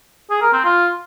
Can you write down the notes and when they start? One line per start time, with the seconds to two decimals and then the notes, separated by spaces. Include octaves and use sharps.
0.30 G#4
0.42 A#4
0.53 C4
0.64 F4